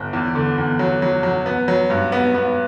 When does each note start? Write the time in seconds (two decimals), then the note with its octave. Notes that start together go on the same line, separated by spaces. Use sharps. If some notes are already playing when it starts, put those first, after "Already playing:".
Already playing: G1
0.13 E2
0.35 D3
0.58 E2
0.79 F#3
1.02 F#3
1.23 F#3
1.46 B3
1.68 F#3
1.90 G2
2.12 B3
2.34 B3